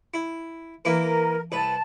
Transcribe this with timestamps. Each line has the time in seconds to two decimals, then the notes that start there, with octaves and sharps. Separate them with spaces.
0.14 E4
0.85 E3 A#3 E4 A#4
1.52 C2 B4 A5